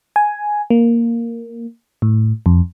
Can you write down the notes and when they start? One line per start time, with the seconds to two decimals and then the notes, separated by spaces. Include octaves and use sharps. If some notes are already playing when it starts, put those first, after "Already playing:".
0.16 G#5
0.70 A#3
2.02 A2
2.46 F2